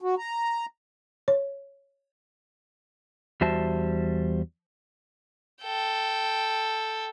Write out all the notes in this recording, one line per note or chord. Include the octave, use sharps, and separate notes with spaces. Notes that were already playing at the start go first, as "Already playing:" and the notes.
F#4
A#5
C#5
E2 G3 F#4 C5 E5 A5
A4 G5